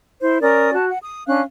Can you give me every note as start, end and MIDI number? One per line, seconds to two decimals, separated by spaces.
0.22 0.37 64
0.22 0.37 72
0.41 0.73 61
0.41 0.73 70
0.41 0.73 74
0.41 0.73 87
0.73 0.88 66
0.73 0.88 81
0.90 0.99 78
1.03 1.26 87
1.27 1.41 61
1.27 1.41 62
1.27 1.41 77
1.27 1.41 90